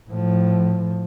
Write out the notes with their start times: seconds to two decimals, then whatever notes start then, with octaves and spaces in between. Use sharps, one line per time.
0.11 A2 F3